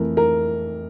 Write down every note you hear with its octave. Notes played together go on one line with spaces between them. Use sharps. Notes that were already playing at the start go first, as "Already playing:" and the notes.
Already playing: F2 E3 A3 A#4
A#4